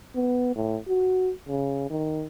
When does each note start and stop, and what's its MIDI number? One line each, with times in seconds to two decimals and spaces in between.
0.15 0.54 59
0.56 0.77 45
0.88 1.32 66
1.48 1.85 49
1.90 2.27 51